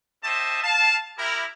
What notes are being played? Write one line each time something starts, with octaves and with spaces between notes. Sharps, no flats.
C4 G4 C5 D#5 E5 A5
F5 A5
E4 G4 A#4